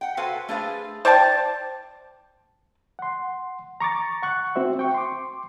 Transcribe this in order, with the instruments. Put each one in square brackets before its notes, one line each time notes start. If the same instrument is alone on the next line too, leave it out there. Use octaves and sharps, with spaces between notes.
[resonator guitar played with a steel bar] F#5 G5
F#4 A4 B4 C5 F5 G#5
A3 D4 G#4 B4 C5 F5
[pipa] C5 D5 G5 A5
[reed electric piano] F#5 C6
A#5 C#6 D6 A6
F#5 C#6 F#6
C4 F#4 C5 E5
G5 C#6
C6 D6